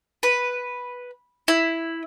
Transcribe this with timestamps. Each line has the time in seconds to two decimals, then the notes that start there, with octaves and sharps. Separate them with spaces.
0.23 B4
1.48 E4